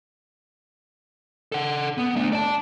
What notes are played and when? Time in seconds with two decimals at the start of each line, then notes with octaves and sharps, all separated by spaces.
1.52 A4 F#5
1.98 B3
2.16 A3 D4
2.33 D5 A5